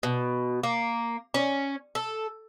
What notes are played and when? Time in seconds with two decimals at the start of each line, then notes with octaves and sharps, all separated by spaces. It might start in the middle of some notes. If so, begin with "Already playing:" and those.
0.03 B2
0.63 A#3
1.34 C#4
1.95 A4